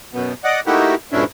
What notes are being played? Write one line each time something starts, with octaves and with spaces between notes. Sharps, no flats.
F#2 B2 B3
D5 D#5 F#5
A3 A#3 D#4 E4 F#4 G4
F2 G#2 B2 C#4 D4 E4